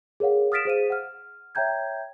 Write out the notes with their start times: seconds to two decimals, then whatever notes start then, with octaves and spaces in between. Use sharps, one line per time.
0.20 G#4 A#4 C#5 F5 F#5
0.52 D#6 F6 A6 B6 D7 E7
0.65 G#4 C5 F5 D#7
0.90 F#5 F6
1.55 C#5 E5 G5 A#5 G6 G#6